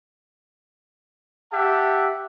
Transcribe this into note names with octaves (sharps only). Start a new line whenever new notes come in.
G4 E5 F#5 A5